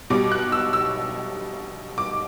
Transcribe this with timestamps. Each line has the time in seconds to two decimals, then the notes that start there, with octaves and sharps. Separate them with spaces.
0.10 B2 G3 D6
0.32 F#6
0.52 E6
0.73 E6
1.98 D6